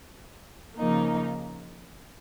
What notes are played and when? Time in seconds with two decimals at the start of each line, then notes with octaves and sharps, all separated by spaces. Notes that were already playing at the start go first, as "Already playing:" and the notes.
0.77 C#3 F3 A#3 D#4